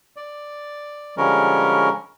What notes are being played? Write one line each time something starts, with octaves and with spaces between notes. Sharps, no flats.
D5
D3 F3 G3 G#3 C#4 A#4